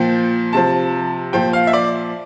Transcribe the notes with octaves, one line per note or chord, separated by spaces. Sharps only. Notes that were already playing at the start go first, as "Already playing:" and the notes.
Already playing: A#2 F3 G5
C3 F3 A5
A#2 F3 G5
F5
E5
D5